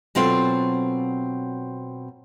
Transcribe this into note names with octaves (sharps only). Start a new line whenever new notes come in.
B2 F#3 C4 F4 A4 G5